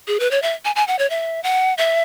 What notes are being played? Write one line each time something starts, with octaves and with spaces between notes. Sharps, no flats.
G#4
B4
C#5
E5
G#5
G#5
F#5
C#5
E5
F#5
E5